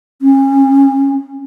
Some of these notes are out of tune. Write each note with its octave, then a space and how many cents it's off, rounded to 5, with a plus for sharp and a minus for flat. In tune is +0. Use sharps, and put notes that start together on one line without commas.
C#4 -30